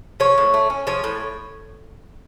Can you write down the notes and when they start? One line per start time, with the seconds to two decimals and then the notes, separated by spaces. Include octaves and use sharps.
0.20 F3 C#5
0.38 A2
0.54 A3
0.70 C#4
0.87 F3 C#5
1.04 A2